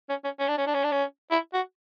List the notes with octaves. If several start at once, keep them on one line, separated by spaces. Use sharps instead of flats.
C#4
C#4
C#4
D4
C#4
D4
C#4
D4
C#4
E4
F#4